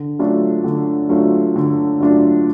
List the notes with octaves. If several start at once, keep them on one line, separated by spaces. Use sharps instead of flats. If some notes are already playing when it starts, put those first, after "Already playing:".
Already playing: D3
F#3 A3 D4 F4
D3
F#3 A3 D4 F4
D3
F#3 A3 D4 F4